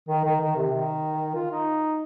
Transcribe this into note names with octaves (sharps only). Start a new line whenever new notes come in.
D#3
D#3
D#3
C3
D#3
F4
D#4